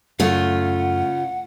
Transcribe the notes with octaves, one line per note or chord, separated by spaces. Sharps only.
F#2 C#3 A3 F4 F#5